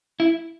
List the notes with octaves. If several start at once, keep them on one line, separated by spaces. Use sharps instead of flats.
E4